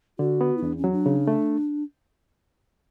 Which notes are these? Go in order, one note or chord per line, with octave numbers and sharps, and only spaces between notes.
D3 F#4
B3
E4
E2 D4
C#4
F#3
D4
C#3
A3